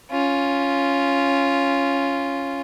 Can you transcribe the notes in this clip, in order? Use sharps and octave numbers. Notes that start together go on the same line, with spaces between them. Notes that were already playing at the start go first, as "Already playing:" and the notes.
C#4 F4